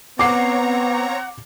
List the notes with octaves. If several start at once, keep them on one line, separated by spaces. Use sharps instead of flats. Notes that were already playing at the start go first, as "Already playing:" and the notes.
B3 C4 C#5 F#5 A#5 D6 C7